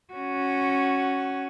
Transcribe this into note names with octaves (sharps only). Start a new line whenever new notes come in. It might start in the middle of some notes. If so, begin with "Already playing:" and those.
C#4 F#4